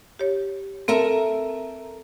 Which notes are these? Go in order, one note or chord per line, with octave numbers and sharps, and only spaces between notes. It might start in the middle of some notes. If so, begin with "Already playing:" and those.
G4 C#5
C4 A4 A#4 E5